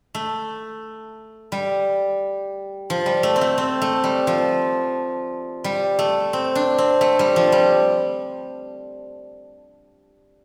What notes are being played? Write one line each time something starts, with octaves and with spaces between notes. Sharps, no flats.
A3
G3
F3
G3
A3
C4
A3
C4
A3
G3
F3
G3
A3
C4
D4
C4
A3
G3
F3
G3